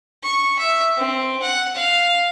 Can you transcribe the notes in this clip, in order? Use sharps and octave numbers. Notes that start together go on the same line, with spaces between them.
C#6
E5
C4
F#5
F5